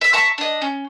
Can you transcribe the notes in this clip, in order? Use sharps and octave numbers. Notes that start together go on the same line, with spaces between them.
E5 E6
E5 A5 A#5 C#6
D4 D#5
C#4